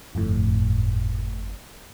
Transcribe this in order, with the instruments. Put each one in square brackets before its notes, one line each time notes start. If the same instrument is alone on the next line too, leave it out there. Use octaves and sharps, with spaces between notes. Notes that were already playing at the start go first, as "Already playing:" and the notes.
[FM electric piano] G1 F2 A2